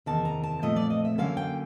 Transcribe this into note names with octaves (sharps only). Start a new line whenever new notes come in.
E2 C3 D#3 A5
A#5
A5
A#2 F3 A3 C4 D#5
D5
D#5
E5
D3 F#3 A#3 C#4 F5
G5